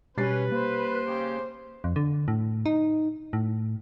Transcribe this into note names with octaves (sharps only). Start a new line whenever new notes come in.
B2 G3 C#4 B4 A6 C7
A#3 C5
C#3 G4
F2
D3
A2
D#4
A2